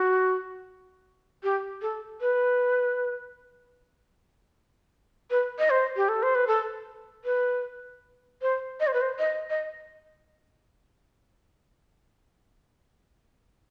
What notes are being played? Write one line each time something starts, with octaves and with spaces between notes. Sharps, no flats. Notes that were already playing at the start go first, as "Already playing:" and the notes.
Already playing: F#4
G4
A4
B4
B4
D#5
C5
G4
A4
C5
B4
A4
B4
C5
D#5
C5
B4
C5
D#5
D#5